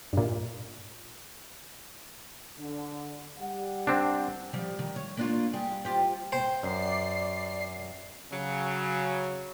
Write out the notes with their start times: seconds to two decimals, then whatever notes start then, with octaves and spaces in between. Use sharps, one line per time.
0.13 G2 A#2
2.59 D3
3.38 G3 F#5
3.87 C4 D4
4.53 F3 G3
4.79 D#3
4.96 C#5
5.17 A#3 D4 F4
5.53 G3 G#4
5.85 F4 G4 C5
6.32 C5 G5
6.63 F#2 D5 C7
8.32 C#3 F#3